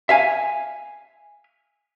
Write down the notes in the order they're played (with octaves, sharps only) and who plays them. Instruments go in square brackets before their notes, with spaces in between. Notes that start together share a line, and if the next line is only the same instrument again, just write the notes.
[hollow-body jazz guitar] E5 F5 G#5